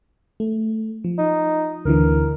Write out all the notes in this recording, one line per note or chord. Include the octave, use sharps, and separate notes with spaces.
A3
F3
D#4
D2 D3 E3 A#4